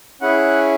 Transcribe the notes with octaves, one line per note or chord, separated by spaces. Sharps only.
C#4 E4 G#4 F#5